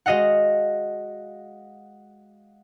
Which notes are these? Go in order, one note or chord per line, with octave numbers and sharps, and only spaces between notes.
G#3 F#4 D#5 F5 F#5